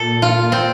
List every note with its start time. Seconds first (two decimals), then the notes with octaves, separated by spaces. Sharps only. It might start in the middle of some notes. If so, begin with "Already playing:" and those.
Already playing: A#2 A4
0.22 F4
0.52 C4